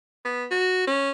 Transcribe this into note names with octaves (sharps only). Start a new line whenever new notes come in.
B3
F#4
C#4